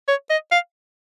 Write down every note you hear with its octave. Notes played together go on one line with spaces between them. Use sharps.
C#5
D#5
F5